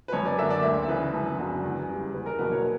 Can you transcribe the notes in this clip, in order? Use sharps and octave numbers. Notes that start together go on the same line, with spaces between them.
B4
F#2 C#5
D5
D3 A#3 D4 E5
D5
D2 E5
C#3 E3 B4
F#2
C#3 F#3 B3 D4
E2
C#3 G3
E2 B4
A#4
B2 F#3 A#3 B4
C#5